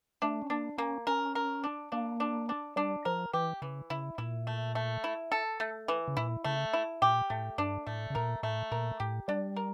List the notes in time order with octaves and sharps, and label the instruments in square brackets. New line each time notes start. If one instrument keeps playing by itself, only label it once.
[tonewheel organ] A3 [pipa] D4
[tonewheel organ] C#4
[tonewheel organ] A#3 [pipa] D4
[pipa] A#3 [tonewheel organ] C#4
[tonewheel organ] C#4 [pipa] A#4
[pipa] A#4
D4
[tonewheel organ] A#3 [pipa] D4
[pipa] D4
D4
[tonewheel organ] G3 [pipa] D4
[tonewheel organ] F3 [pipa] A#4
[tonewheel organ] E3 [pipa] G4
[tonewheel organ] C#3 [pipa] E3
[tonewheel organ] C#3 [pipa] E4
[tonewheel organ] A#2 [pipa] E4
[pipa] A3
A3
E4
A4
A3
E3
[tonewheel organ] C#3
[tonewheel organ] A#2 [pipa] E4
[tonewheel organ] C#3 [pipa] A3
[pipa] E4
[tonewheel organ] A#2 [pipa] G4
[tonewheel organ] A2 [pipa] A3
[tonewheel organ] G2 [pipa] D4
[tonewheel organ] A2 [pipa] A3
[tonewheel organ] C#3
[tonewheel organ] A#2 [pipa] A#4
[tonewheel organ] A2 [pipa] A3
[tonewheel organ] A#2 [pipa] A#4
[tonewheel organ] A2 [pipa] G4
[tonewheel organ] G3 [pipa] D4
[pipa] A#4